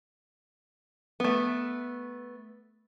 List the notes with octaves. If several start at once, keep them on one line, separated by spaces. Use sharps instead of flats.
A3 B3